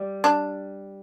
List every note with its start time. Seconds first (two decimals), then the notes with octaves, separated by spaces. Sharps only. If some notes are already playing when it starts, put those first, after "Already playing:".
Already playing: G3
0.24 D4